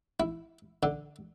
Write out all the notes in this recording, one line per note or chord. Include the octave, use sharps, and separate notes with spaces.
E4
D3